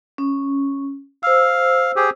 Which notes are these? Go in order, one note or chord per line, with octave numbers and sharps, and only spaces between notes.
C#4
C5 F5 E6
G4 G#4